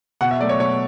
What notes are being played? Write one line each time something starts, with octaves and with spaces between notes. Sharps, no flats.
B2 F#5
E5
F#3 A3 D5
C#5
B2 C#5